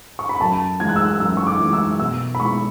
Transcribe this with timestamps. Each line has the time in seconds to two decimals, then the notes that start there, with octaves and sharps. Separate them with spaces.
0.19 C#6
0.29 B5
0.40 F#2 A5
0.80 E3 G#3 G#6
0.89 F#6
0.96 E6
1.05 F#6
1.20 F#2 E6
1.37 C#6
1.47 D6
1.60 E3 G#3
1.73 E6
2.00 B2 E6
2.35 B5
2.40 G#3 B3 E4 C#6